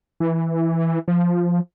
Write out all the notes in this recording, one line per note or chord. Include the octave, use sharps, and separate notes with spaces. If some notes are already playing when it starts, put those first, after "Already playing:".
E3
F3